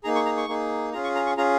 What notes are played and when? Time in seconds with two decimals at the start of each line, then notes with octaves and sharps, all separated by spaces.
0.04 A#3 D#4 G#4 A#5
0.15 C#6
0.26 A#5
0.37 C#6
0.48 A#3 D#4 G#4
0.93 C#4 F4 G#4 A#5
1.04 C#6
1.15 A#5
1.26 C#6
1.37 C#4 F4 G#4 A#5